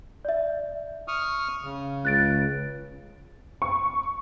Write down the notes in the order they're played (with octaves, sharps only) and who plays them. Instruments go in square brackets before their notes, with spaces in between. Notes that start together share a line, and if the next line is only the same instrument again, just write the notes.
[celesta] D5 E5
[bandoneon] C#6 D#6 F6
C#3
[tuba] C#2 [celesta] F#6 A6 D7
[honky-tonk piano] C#6